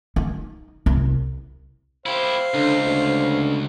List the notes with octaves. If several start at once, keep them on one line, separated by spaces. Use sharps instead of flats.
D#4
C2
E4 G4 C5 F5
C#2 D3
D2